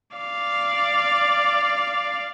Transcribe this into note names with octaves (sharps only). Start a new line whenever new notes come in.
D5 F5